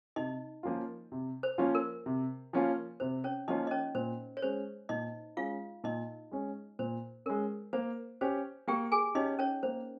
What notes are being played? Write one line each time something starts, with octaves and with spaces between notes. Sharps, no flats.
C3 D#4 D#5
F3 A#3 C#4 F4
C3
C5
F3 A#3 C#4 F4
A#4
C3
F3 A#3 C#4 F4
C3 C5
C#4 C#5
F3 A#3 C#4 D#4 F4 D#5
D#5
C#4 C#5
A#2 C5
C#5
G#3 C#4 C5
A#2 D#4 D#5
G#3 C#4 F4 F5
A#2 D#4 D#5
G#3 C#4
A#2 C5
G#3 C#4 A#4
A#3 C5
C#4 G4 C5
A#3 G4 G5
G#4 G#5
C#4 D#4 G4 D#5
C#4 C#5
A#3 C5